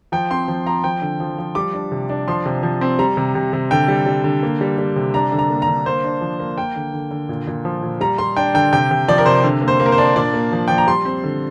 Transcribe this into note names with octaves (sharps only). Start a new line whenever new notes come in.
F3 G5
C4 C6
F3
F3 A#5
F3 G5
D3
F3
F3
G3 D6
D4
C3
D4
F3 C6
C3
F3
C4
G3 A#5
C3
C3
C3
D3 G5
G3
G3
D3
A#3
G3
G3
C3
D4 A#5
D3
A#5
A#3
A#5
D3
A#3 C5
D4
F3
A#3
A#3 G5
D3
D3
D3
A#2
A#2
F3
A#2
G3 A#5
G3 C6
D4 G5
D3 G5
C3 G5
C3
F3 D5
A#4
C3 C5
D3
A#3
C5
A#3
A#4
C5
D4
A#2 D5
A#3
F3
F3 G5
A#5
G3 C6
C4
D3